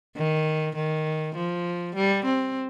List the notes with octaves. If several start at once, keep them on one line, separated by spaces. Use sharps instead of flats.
D#3
D#3
F3
G3
C4